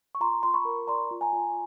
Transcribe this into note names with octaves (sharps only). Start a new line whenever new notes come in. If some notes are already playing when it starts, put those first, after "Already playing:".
C#6
F4 A#5 C6
F4 C6
B5 C#6
A#4
D5 A#5 C6
F4
G#5 A#5
F4